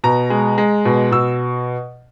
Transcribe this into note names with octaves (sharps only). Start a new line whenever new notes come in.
B2 A#5
G#3
G#3
B2
B2 E6